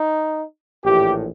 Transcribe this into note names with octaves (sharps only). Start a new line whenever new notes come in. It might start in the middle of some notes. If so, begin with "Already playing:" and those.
Already playing: D#4
A#1 A2 E3 G4